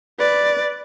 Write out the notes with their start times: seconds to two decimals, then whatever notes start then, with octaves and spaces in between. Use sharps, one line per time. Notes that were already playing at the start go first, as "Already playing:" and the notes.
0.19 B4 D5